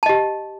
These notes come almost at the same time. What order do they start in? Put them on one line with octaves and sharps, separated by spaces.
A5 D#5 G4